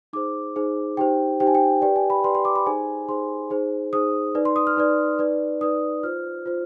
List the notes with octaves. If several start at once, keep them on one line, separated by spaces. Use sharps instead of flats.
D#4 G#4 C5 D6
D#4 G#4 C5
D#4 G4 C5 G5
D#4 G4 C5 G5
G#5
G5
G4 B4 D5 G5
G#5
B5
G4 B4 D5 C6
C6
D6
B5
D#4 G#4 C5 G#5
D#4 G#4 C5 C6
D#4 G#4 C5
D#4 G#4 C5 D#6
D#4 B4 D5
C6
D#6
F6
D#4 B4 D5
D#4 B4 D5
D#4 B4 D5 D#6
F4 C5 F6
F4 C5